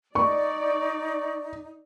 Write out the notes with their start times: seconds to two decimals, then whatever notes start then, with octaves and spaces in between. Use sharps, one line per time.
0.15 D#4 D5 C#6